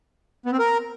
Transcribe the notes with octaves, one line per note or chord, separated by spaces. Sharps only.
B3
C4
A#4